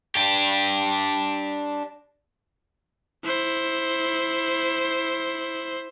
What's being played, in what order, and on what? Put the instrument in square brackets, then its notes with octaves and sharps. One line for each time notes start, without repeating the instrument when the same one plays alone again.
[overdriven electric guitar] D4 G4
[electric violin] E4 C5